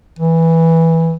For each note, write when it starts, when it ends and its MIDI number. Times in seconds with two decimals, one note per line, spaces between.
0.19 1.15 52